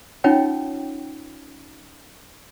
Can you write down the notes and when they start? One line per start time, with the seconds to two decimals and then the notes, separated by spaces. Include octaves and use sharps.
0.24 C#4 D#4 F4 C#5 F#5 G5